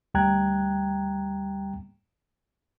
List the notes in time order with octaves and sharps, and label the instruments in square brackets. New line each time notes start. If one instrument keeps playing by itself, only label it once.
[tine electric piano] D2 G3 G5 A#5 F#6 G#6